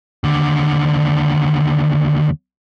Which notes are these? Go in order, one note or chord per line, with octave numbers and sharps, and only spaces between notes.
D#2 D3